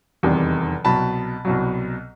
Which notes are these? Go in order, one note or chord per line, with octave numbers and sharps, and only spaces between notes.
F1 E2 C3 D#3 G3
C2 B2 F#3 A5 B5
C2 B2 F#3